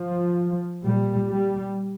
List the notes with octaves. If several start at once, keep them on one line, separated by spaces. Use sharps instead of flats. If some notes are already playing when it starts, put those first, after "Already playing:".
Already playing: F3
A#2 G3
G3